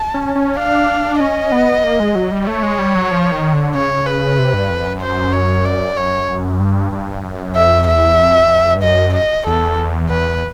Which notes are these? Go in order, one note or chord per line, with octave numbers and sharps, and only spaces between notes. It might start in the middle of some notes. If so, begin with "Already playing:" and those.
Already playing: A5
C#4
C#4
D4 F5
C#4 D#5
B3
A#3
G#3
F#3
G3
A3 C#5
G#3
G3
F#3
F3
D#3
D3
C#3 C#5
B4
C3
G2
F2
F#2
C5
C#5
D5
C#5
F#2
G2
G2
F#2
F2 E5
E2 E5
F2
G2
F#2 D#5
D#5
E2 A4
E2 B4